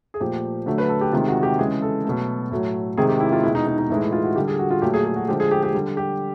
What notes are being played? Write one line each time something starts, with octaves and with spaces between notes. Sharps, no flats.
G#4
A#2 F3 A3 G4
D3 F#3 A3
B4
A4
G4
C3 D#3 G#3 F4
F#4
G4
C#3 E3 G#3 G#4
A4
B2 F#3 A3
A2 F#3 A3
C3 D#3 G#3 G#4
G4
E4
F4
B2 G#3 E4
D#4
D#4
D#4
A2 E3 G#3 D#4
E4
F4
F#4
D3 G3 G4
G#4
F#4
F4
A#2 F#3 A3 G4
G#4
G#4
F#4
D3 F3 G#3 G4
G#4
G4
G4
D3 G3
G4